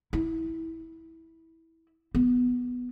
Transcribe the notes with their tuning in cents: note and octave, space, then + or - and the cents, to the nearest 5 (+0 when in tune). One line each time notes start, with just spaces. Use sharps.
E4 -15
B3 +5